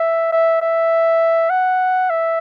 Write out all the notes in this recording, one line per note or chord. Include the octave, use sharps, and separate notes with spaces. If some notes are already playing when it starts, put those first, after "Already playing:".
Already playing: E5
E5
E5
F#5
E5